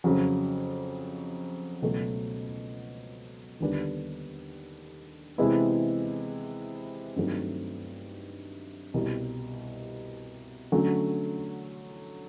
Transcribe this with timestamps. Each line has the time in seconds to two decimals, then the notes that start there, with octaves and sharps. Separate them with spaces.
0.04 F2 C#3 F#3
1.82 C#2 B2 F#3 A3
3.60 D#2 D3 G3 B3 D4
5.38 C3 E3 G#3 B3 E4
7.16 G2 D#3 F#3 A3 C4
8.94 C2 B2 G3
10.72 D3 F#3 A3 C#4